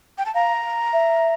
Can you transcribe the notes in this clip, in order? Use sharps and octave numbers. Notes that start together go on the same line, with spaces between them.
G5
A5
F5 A#5
E5